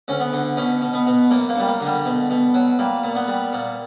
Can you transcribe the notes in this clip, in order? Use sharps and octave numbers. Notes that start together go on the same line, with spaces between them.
D2 C#4
B3
D3
B2 C#4
B2
B3
B2
F#2 A#3
A#3
F#2 G3
A#3
D3
G3
B2
B2
F#3
G3 A#3
A#2
B3
G3
A#2